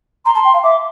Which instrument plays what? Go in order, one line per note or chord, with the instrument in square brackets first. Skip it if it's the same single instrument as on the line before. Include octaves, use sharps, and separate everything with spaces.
[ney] A#5 [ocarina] C6
[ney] A5
G5
F5
[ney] E5 [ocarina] D6